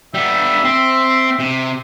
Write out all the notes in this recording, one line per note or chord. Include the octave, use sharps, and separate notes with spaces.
G3 B3 E5
C4
C3